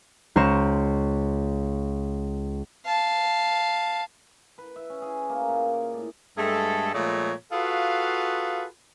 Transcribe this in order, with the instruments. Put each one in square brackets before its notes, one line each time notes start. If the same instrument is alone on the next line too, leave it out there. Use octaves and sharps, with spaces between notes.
[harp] C#2 C5 A#5 C#6 A#6 E7
[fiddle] F5 A5
[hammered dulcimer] B4
E5
C#4
G#4
A#3
A#2
D6
A2
[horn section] G2 G#3 A3 G#4 A4
A#2 F3 G#3 A3 C#5
F4 F#4 G#4 A4 B4 F5